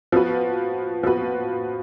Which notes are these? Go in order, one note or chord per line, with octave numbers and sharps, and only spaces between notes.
F3 B3 F#4 B4
F3 B3 F#4 B4